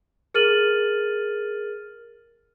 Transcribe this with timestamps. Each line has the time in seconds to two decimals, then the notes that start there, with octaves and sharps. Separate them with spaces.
0.34 G#4 A#4 F6 A6 D#7 F#7